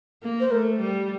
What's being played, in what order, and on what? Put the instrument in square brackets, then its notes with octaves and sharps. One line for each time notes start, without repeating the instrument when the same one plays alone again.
[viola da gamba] A#3
[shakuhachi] C5
[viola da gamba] A3 [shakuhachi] A#4
[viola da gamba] G3